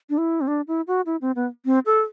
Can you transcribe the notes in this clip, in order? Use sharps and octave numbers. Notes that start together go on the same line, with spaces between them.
D4
E4
C4
D4
E4
F#4
E4
C4
B3
C4
A4